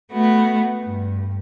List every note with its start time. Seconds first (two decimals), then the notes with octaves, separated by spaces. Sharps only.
0.12 A3 B3 F#4
0.83 G2